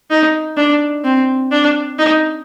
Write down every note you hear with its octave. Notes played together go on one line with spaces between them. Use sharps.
D#4
D4
C4
D4
D#4